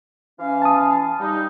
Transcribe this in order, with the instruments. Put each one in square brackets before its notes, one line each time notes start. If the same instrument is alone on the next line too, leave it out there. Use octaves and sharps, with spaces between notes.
[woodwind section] E3 C#4 F5
[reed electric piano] A5 D#6
[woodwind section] G3 D#4